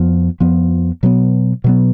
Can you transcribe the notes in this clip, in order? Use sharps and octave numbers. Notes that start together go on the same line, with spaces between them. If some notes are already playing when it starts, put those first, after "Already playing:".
Already playing: F2 F3 B3
F2 F3 B3
B2 F#3 B3
B2 F#3 B3